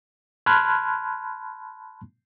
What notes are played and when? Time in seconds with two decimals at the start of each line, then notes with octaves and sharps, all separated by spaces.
0.46 A5 B5 C6 F6 F#6 G#6